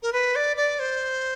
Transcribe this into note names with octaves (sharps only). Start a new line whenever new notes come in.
A#4
B4
D5
D5
C5